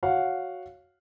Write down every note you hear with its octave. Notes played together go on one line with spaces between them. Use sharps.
F#4 C#5 F5 F#5